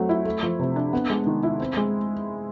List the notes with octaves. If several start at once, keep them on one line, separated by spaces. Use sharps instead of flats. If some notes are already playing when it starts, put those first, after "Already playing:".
Already playing: F#3 A3 C4
E4
A3
F3
C3
D4
B3
G#3
D#3
E4
C4
G#3